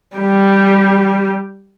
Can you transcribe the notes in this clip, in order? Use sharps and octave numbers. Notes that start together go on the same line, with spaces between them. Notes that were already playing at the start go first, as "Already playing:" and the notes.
G3 G4